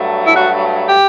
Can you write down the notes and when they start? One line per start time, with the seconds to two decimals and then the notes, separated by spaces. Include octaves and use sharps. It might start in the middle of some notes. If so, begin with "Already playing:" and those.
Already playing: G2 F#3 A3
0.26 E4
0.34 F#4
0.88 G4